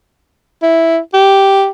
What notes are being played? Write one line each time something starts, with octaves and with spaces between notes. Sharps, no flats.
E4
G4